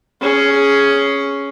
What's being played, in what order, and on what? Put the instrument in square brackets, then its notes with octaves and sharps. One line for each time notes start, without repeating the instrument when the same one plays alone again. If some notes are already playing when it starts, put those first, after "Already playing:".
[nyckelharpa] C#4 G#4